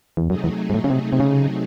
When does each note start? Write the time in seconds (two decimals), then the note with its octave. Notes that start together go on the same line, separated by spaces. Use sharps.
0.17 E2
0.30 F#2 C3 F#3 A3 D#4 G#4
0.44 E2
0.70 G#2
0.74 A2
0.84 C#3
0.90 C3
1.13 C3
1.20 C#3